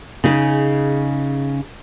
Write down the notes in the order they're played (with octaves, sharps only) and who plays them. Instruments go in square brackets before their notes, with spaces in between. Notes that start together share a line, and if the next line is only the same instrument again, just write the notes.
[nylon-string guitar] C#3 D#4 G#4